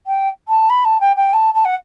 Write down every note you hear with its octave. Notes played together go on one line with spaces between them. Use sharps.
G5
A5
B5
A5
G5
G5
A5
A5
F#5